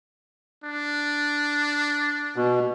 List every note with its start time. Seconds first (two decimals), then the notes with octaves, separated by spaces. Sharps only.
0.64 D4
2.36 B2